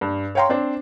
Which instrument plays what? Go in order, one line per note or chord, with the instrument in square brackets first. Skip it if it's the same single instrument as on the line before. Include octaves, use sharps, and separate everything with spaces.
[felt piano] G2
C#5 F5 G5 A#5 C6
C4 D4 C5